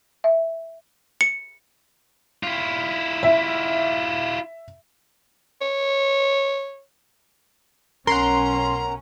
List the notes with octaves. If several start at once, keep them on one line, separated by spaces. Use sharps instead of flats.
E5
C#7
E4 F4
E5
C#5
B1 C#4 A#4 F#5 A#5 C6